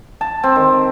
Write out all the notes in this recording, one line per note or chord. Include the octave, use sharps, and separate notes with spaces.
A5
C4
D#3